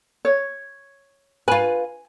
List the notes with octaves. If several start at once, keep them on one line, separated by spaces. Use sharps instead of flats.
C#5
F4 B4 G#5